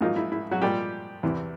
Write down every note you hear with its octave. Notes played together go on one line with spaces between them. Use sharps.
G#2 D#3 F3 F#3 A#3 D#4 F4
E4
E4
F#3 F#4
A#2 F3 G3 G#3 G4
E2 C3 E3